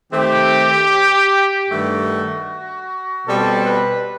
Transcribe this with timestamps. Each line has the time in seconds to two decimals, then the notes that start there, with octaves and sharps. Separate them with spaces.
0.12 D#3 A3 C4 G4
1.70 G2 D#3 A3 F#4
3.27 B2 G3 C4 A4
3.67 B4